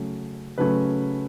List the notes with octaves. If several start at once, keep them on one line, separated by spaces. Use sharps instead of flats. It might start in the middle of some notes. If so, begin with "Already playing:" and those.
Already playing: C#3 F#3 A3 C#4
C#3 F#3 A3 C#4 B4